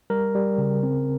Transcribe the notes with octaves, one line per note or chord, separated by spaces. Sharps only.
G3 A#4
G3
C#3
C4